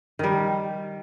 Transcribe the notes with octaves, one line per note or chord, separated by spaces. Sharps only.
D#3 G3